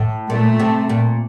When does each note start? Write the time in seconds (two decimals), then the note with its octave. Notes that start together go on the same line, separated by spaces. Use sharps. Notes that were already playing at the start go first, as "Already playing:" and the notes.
Already playing: A2
0.30 A#2 A3
0.60 C3
0.89 A#2